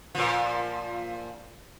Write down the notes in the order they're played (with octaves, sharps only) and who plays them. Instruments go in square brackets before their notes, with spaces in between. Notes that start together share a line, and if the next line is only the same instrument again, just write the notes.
[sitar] A#2 F3